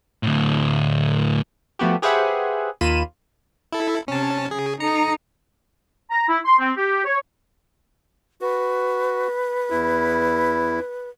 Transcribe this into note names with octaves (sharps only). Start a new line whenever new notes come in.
D2 A2
F3 A3 B3 F#4 G4
G4 G#4 B4 C5 E5 F#5
D#2 A#3 F4 B5 D#7 E7
E4 A4
C3 C#4 A5
C#3 G#4
D#4 A4 A#5 C#7
A#5
E4
C6
C4
G4
C#5
F#4 B4
E2 E4